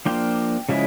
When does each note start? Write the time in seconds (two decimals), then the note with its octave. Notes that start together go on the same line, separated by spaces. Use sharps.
0.06 F3 A#3 D4 F4 G5
0.69 C#3 F3 G#3 C#4 E4